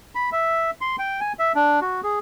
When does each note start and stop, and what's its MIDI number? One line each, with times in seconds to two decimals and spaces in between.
0.15 0.30 83
0.32 0.70 76
0.81 0.96 84
0.99 1.20 79
1.21 1.33 80
1.39 1.52 76
1.55 1.80 62
1.82 2.01 66
2.03 2.19 68